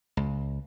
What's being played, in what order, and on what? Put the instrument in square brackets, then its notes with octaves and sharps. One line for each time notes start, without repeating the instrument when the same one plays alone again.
[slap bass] C#2